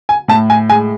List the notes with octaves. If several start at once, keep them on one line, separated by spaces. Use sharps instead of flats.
G#5
A2 A5
G#5
G#3 G#5